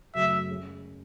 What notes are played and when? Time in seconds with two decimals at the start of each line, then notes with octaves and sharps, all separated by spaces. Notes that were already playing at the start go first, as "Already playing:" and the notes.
0.14 F#2 C#3 F#3 A3 C#4 E5
0.49 G#3 C#4 G#4